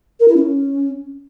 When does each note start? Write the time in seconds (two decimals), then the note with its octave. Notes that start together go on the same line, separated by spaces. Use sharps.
0.20 A#4
0.28 E4
0.36 C#4